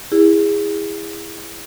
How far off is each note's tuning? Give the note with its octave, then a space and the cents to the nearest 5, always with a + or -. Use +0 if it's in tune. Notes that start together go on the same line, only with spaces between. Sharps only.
E4 +0 G#4 -25